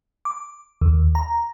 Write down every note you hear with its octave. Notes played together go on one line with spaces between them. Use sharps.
D6
D#2
A#5